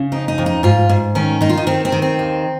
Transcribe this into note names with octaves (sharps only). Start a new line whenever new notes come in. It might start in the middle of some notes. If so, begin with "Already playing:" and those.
Already playing: C#3
F2 D#4
D#4
F2
D#4
G#2 F4
G#2
D#3 C#4
D#3 D#4
F4
D#4
D#3 C4
C4
D#3
C4
D#2